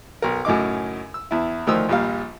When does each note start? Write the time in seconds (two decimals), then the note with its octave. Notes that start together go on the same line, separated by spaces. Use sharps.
0.22 B1 A#4
0.45 F#2 A2 C#3 D#4 D6
1.14 E6
1.31 E2 E4
1.67 D2 D#3 F3 D#6 E6
1.89 A#1 D#2 G3 F5